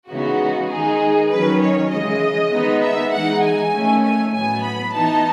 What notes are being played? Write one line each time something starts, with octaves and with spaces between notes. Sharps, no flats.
C#3 E3 G#3 B3 D#4 F#4
D#3 G#3 D#4 G#4
D#3 F#3 C#4 B4
C#5
C#3 E3 G#3 D#5
D#3 G#3 B3 D#4
E5
E3 G#3 D#4 F#5
G#5
D#3 A3 C#4
G#5
A2 F#3 B3 G#5
B5
E3 B3 D#4 A5